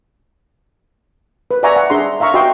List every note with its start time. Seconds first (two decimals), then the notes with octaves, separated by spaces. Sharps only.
1.51 B4
1.63 D5 E5 F#5 G#5 A#5 C#6
1.76 F#5
1.90 D4 G#4 E5 A#5 C6
2.20 E5 F5 A#5 C#6
2.34 F#4 D#5 G5 C6